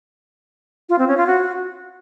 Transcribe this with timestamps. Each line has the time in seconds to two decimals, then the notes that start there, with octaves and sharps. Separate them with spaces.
0.89 F4
0.99 C4
1.08 C#4
1.17 F4
1.27 F#4